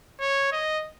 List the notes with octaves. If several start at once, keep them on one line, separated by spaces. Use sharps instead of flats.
C#5
D#5